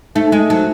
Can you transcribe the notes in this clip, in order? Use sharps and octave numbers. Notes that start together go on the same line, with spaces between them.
A3 D#4
D#4
G#3
D#4
F#3 D#4